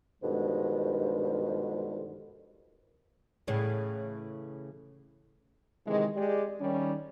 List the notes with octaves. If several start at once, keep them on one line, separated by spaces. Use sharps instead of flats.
G2 B2 D3 D#3 F3 G#3
A2 C#3 E3
C3 D#3 E3 G#3
G#3 G4 D5
D#3 G3 C#4